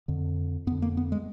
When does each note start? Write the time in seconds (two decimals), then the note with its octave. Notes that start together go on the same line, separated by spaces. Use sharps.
0.08 F2 D3
0.67 F2 B3
0.72 D3
0.82 A#3
0.97 B3
1.12 G#3